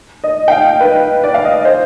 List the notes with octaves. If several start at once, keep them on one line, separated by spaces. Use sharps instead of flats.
D#5
G5
F5
B4
D5
F5
D#5
C5